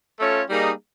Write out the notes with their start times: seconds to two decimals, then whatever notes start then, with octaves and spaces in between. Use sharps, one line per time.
0.17 A3 C#4 F4 A4 C#5
0.47 G3 A#3 D#4 G#4